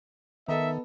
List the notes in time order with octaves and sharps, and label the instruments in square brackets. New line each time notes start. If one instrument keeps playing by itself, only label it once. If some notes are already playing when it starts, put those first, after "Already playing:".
[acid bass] D#3 [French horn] B3 [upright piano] A4 D#5 A#5 [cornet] E5